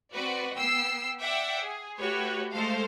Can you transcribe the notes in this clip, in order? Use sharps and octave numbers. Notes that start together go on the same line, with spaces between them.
C4 F#4 B4 D5
B3 G5 E6 C7
D5 E5 F#5 G5 D6
G#4
A3 F#4 G4 B4 C#5
G#3 A3 A4 C5 F5